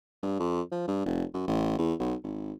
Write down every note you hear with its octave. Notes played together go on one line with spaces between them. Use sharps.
G2
F2
F3
G2
F1
F#2
A1
E2
B1
G#1